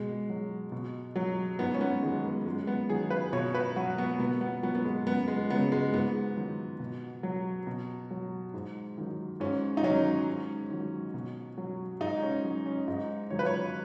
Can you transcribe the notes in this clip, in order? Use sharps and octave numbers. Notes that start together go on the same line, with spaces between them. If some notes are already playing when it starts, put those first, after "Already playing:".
Already playing: B2 G#3
F#3
B2
F#3
G#2 B3
C#4
B3
D#3 F#3 G#3
B3
F#2 G#3
B3
D#3 F#3 G#4
B4
B2 C#5
B4
F#3 F#4
B3
B2 B3
B3
F#3 B3
B3
G#3
F#2 B3
G#3
C#3 F#3 B3
G#3
G#2 B3
D#3 F#3
B2
F#3
B2
F#3
G#2
D#3 F#3
G#2 C#4
D#4
D#3 F#3 C#4
G#2
D#3 F#3
B2
F#3
G#2 D#4
C#4
F#3
C#4
G#2 D#4
D#3 F#3 C#5
B4
C#5